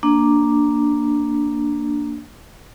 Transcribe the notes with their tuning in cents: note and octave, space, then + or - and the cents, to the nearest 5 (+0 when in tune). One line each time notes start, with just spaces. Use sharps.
A#3 +0 D4 +0